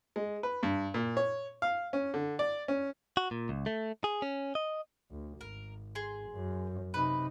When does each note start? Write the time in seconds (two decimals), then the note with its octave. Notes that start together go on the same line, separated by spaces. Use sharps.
0.16 G#3
0.43 B4
0.63 G2
0.94 A#2
1.17 C#5
1.62 F5
1.93 C#4
2.14 D3
2.39 D5
2.68 C#4
3.17 F#4
3.31 A#2
3.49 C#2
3.66 A3
4.04 G#4
4.22 C#4
4.55 D#5
5.11 D2
5.41 G#1 A#4
5.95 G#4 C6
6.31 F#2
6.94 C3 D#4 B4